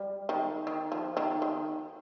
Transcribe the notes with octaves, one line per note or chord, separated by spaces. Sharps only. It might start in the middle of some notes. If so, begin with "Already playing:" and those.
Already playing: G3
D#3
D#3
F3
D#3
D#3